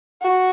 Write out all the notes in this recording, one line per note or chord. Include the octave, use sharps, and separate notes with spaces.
F#4